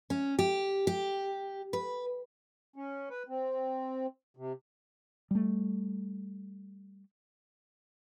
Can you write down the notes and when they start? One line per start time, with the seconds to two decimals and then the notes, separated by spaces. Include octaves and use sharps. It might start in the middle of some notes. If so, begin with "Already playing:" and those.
0.10 C#4
0.39 G4
0.87 G4
1.73 B4
2.76 C#4
3.10 B4
3.29 C4
4.37 C3
5.31 G3 A3